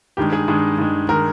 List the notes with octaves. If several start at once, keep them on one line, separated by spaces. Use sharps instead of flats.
G2 D#3 G#3 G4
G#4
G2 D#3 G#3
G2 D#3 G#3
D#3 G#3 A#4